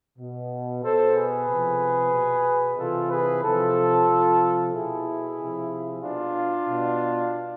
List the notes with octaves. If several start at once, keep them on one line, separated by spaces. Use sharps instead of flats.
B2
B2 A4 C5
G#4 B4
C3 F3
B2
C3 E3 F4 A4
G#4 B4
C3 F3 F4 A4
C3 F3
B2 E4 G#4
C3 F3
B2 D4 F4
B2